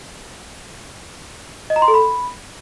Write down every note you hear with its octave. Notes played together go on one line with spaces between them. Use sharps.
D#5
A#5
C6
A4
B5